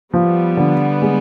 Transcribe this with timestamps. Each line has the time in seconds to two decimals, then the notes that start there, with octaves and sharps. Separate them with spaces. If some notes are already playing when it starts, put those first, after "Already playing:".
0.13 F3 G3 B3
0.57 D3
1.02 G#3